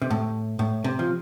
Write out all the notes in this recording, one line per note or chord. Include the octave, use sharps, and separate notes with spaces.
C3
A2
A2
C3
F3